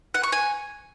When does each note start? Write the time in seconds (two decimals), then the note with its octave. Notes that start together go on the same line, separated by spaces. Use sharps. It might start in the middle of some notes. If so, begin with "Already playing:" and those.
0.14 F#5
0.23 C#6
0.32 G#5